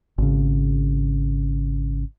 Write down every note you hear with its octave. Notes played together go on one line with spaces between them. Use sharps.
G#1 C#3